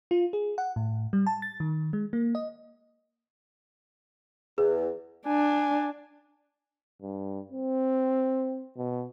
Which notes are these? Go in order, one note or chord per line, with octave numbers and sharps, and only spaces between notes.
F4
G#4
F#5
A2
G3
A5
A6
D#3
G#3
A#3
D#5
E2 G#4
D4 G#5
G2
C4
B2